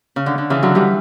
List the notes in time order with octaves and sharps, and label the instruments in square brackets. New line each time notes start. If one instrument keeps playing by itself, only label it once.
[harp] C#3
D3
D3
C#3 E3
D3 F#3
E3 G3